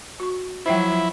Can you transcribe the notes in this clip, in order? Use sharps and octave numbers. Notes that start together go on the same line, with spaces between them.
F#4 C#6
F3 F#3 E4 C5 E5 G5